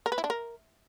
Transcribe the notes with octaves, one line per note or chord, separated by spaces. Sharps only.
A#4
B4
E4
D4
A#4